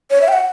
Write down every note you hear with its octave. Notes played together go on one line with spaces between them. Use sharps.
C#5
E5
G5
F#5